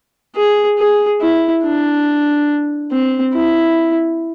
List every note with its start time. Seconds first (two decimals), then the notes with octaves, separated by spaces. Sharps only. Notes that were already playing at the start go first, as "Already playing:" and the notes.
0.36 G#4
0.78 G#4
1.21 E4
1.63 D4
2.91 C4
3.34 E4